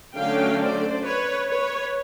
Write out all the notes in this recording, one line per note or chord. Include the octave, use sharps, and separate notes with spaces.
D3 F#3 A3 C#4 F5 G5
C5 D5
B4 C#5
B4 C#5